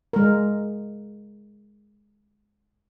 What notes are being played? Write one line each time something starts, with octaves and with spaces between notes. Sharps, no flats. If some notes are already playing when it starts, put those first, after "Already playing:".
G#3 A#4